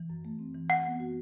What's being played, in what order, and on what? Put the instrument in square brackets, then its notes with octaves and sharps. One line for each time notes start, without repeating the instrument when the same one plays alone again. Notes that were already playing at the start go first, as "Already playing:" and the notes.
Already playing: [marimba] E3
F#2
A3
C4
E3
[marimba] F#2 [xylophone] F#5
[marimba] B3
F#4